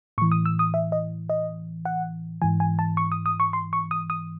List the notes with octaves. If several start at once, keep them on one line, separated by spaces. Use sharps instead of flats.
A2 E3 C#6
D#6
E6
D#6
E5
D#5
D#5
F#5
G#2 E3 G#5
G#5
A5
C#6
D#6
D#6
C#6
C6
C#6
D#6
D#6